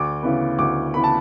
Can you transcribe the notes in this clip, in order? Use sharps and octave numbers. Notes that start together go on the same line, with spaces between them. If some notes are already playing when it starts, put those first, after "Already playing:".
Already playing: D2 D6
C#3 E3 B3
D2 D6
C#3 E3 B3 B5
A5